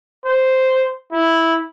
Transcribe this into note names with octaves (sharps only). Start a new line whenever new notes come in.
C5
E4